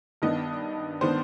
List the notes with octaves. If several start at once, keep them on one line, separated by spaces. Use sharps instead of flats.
G2 D#3 B3 D4 D#5
D#3 B3 D4 C5